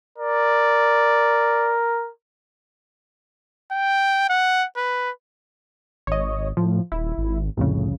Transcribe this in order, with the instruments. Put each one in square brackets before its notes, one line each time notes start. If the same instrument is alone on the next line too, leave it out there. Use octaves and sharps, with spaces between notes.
[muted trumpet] A#4 [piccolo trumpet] D5
[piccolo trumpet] G5
F#5
B4
[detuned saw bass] G#1 [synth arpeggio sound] C#5 D#5
[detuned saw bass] A2 [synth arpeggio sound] F3
[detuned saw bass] D#1 [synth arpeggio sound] E4
[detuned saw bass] G#1
[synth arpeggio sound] C2 F2 C#3 [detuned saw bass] A2